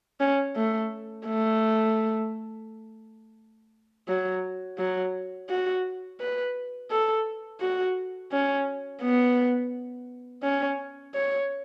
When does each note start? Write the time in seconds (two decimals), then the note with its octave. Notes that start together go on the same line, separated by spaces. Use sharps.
0.20 C#4
0.56 A3
1.27 A3
4.08 F#3
4.79 F#3
5.50 F#4
6.20 B4
6.91 A4
7.61 F#4
8.32 C#4
9.02 B3
10.43 C#4
11.15 C#5